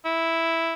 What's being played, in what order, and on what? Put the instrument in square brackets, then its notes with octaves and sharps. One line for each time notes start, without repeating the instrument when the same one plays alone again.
[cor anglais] E4